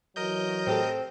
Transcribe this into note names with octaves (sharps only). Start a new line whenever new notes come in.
E3 F#3 A#4 D#5 G6
A2 C4 G4 A4